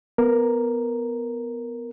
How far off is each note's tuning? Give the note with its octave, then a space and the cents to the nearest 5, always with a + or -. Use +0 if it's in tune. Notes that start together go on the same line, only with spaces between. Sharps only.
B3 +0 A#4 +0